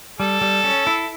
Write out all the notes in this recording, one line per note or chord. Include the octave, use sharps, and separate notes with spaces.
G3 A4
G3
C#4
E4